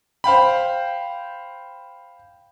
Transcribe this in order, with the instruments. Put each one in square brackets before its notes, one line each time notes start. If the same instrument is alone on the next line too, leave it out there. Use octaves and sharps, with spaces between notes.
[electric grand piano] C5 F5 G5 B5